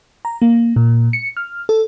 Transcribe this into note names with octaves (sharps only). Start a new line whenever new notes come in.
A#5
A#3
A#2
C#7
F6
A4